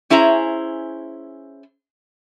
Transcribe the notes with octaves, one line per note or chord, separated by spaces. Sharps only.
C#4 E4 G#4 C5 A#5